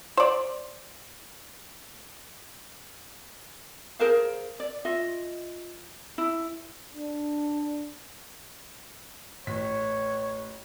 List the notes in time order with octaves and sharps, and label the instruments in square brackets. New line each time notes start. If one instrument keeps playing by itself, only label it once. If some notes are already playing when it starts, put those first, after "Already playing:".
[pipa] C5 D5
[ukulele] G#4 A#4 C5 F5
D5
F4 D#5 E5
E4
[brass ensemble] D4
[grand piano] A1 B6 [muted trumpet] C#5